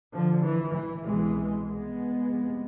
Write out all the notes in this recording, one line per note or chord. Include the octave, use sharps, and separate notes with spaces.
D3 F3
E3
E3
C2 B2 E3 G#3
G#3 B3
F1 F2 C3